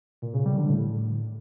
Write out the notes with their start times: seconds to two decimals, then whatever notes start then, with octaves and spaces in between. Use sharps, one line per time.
0.22 A#2
0.34 C#3
0.46 G3
0.57 D3
0.69 A2